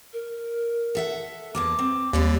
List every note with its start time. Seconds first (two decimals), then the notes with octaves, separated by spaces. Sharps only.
0.13 A#4
0.95 A4 E5 F#5
1.55 E2 A#3 A5 D6
1.79 C4
2.13 D#2 G3 G#3 D5